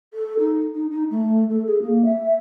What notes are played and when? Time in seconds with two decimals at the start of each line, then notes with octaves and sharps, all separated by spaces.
0.13 A4
0.39 D#4
0.74 D#4
0.90 D#4
1.10 A3
1.49 A4
1.66 G#4
1.82 A#3
2.05 E5